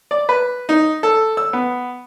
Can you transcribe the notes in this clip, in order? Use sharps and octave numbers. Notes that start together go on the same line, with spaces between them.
D5
B4
D#4
A4
E6
B3